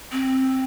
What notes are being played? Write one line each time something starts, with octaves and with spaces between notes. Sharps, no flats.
C4